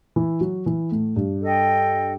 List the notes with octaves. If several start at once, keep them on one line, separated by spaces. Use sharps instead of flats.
E3 E4
F#3 F#4
E3 E4
A2 A3
G2 G3
A4 D#5 G5